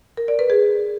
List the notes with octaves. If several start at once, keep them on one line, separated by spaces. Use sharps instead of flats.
A#4
D5
B4
G#4